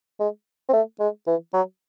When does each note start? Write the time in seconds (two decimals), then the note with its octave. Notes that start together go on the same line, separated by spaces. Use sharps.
0.20 G#3
0.69 C4
0.73 A3
1.00 G#3
1.27 E3
1.53 F#3